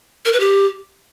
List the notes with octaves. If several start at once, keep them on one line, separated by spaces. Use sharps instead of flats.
A#4
B4
G4